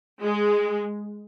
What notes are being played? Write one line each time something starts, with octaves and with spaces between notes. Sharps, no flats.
G#3